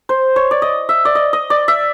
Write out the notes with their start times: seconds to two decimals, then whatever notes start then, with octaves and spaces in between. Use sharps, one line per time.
0.09 C5
0.36 C#5
0.51 D5
0.62 D#5
0.89 E5
1.05 D5
1.15 D#5
1.33 D#5
1.50 D5
1.68 E5